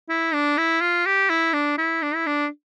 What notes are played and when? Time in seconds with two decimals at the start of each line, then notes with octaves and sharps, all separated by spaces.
0.09 E4
0.33 D4
0.58 E4
0.81 F4
1.06 G4
1.30 E4
1.53 D4
1.78 E4
2.02 D4
2.14 E4
2.26 D4